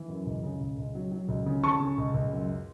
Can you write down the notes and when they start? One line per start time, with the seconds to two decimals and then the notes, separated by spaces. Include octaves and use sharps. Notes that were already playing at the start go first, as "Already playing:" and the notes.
Already playing: E3
0.08 F#2
0.26 C#2
0.43 C#3
0.61 C#2
0.78 C#2
0.95 F#3
1.12 F#3
1.28 C#2
1.46 C#3
1.63 C#3 A5 C#6
1.80 C#3
1.98 C#2
2.14 C#2
2.32 F#2